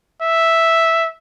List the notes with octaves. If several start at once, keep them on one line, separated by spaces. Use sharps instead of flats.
E5